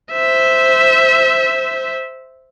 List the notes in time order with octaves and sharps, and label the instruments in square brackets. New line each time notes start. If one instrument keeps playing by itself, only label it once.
[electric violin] C5 E5